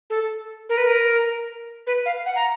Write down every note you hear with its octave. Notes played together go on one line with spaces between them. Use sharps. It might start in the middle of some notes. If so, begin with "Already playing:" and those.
A4
A#4
B4
A#4
B4
F5
F#5
A#5